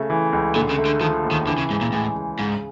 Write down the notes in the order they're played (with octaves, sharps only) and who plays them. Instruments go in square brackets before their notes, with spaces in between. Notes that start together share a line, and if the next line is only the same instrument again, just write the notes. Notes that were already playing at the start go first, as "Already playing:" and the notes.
Already playing: [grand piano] C#3 A3
E3
C#2
[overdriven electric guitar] A#2 [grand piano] D3
[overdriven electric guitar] C#3
[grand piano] A3
[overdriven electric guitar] D3
[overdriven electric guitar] D#3 [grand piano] F3
[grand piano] D#2
[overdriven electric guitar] D#3
[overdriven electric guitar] D3 [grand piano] E3
[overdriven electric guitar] C#3
[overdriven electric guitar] G#2 [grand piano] C#3
[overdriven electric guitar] A#2
[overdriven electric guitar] A2 [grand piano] G#3
[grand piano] C#3
[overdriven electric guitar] G#2 [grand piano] C#3